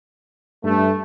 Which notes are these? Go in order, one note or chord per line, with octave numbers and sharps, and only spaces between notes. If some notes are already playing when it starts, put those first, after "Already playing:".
G2 A3